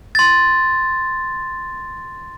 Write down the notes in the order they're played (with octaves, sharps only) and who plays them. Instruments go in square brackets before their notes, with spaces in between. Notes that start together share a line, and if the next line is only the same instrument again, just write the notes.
[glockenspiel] C6 A6